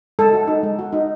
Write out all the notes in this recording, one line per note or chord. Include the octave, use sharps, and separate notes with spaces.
G#3 A4
F#4
D#4
G#3
F#4
D#4